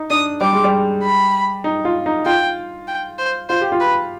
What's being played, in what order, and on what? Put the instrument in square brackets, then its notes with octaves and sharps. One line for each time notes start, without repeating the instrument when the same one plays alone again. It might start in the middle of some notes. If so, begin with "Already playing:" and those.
Already playing: [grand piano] D#4
[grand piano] D4 [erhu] D#6
[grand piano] G3 [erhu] D6
[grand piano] G#3
G3
[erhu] B5
[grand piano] D#4
F4
D#4
[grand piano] F4 [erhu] G5
[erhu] G5
C5
[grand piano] F4 [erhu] C5
[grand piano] G4
F4
[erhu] B4